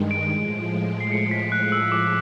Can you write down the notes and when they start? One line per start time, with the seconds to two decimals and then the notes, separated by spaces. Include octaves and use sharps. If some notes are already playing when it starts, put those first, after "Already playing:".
Already playing: G2 D#3 G#3
0.11 D7
0.31 A2 F3 G#3
1.00 C7
1.12 C#7
1.31 B6
1.52 F#6
1.72 E6
1.92 D6